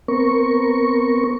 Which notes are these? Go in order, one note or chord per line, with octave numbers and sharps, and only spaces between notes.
B3 C4 A#4 C#6